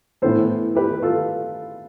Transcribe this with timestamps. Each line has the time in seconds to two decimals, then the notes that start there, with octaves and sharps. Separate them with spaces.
0.22 A2 E3 B3 A4 C5
0.75 G4 B4
1.02 F4 A4